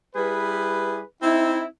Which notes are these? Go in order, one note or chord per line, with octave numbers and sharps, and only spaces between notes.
G3 E4 G#4 B4
C4 D#4 E4